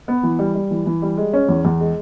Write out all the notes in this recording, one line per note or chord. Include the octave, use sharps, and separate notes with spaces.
B3
E3
G3
G3
E3
E3
G3
G#3
C#4
E2
E2
G#3